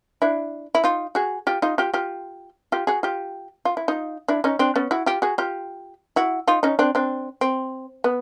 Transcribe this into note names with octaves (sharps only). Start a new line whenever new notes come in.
D4 E4
E4
D#4 F4
F#4 G#4
F4 G4
D#4 F4
F4 G4
F4 G4
F4 G4
F#4 G#4
F4 G4
F4
E4
D#4 F4
D4 E4
C#4 D#4
C4 D4
B3 C#4
E4 F#4
F4 G4
F#4 G#4
F4 G4
E4 F#4
D#4 F4
C#4 D#4
C4 D4
C4 D4
C4
B3